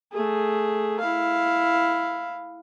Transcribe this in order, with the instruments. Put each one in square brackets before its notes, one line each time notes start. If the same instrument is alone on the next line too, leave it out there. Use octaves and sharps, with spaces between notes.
[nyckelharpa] A3 G#4
E4 F5